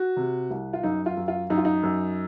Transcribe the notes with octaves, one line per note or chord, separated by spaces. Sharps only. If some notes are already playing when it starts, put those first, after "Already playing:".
Already playing: F#4
C3
C2
F4
F#2 D#4
F4
F#2
F4
F#2 D#4
F4
D#4
F#2